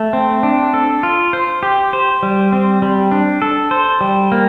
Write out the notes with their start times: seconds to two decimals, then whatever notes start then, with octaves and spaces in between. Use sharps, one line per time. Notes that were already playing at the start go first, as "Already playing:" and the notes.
Already playing: A3
0.13 C4
0.43 D4
0.74 A4
1.03 F4
1.33 C5
1.63 G4
1.93 C5
2.23 G3
2.52 C4
2.82 G3
3.11 D4
3.42 A4
3.71 C5
4.01 G3
4.32 A#3